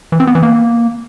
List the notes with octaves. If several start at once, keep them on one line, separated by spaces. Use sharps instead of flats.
E3
C4
B3
E3
A#3